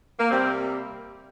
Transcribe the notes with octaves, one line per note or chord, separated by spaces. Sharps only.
A#3
C3 G3 A#3 C4